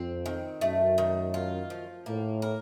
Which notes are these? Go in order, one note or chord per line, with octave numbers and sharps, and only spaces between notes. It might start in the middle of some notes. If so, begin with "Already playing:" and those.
Already playing: F2 C4
D#3
F#2 A3
D#3
F4
F3
A2 A#3
A#4